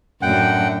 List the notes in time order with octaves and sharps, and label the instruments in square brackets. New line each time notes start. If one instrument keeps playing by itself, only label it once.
[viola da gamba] F#2 A2 D4 [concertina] F#5 G5